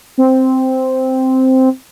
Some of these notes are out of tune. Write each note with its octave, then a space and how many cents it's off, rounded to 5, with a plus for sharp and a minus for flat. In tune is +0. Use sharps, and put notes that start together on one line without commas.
C4 -5